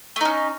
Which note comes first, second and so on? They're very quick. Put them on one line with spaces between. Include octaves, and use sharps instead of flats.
A3 D#4 C#4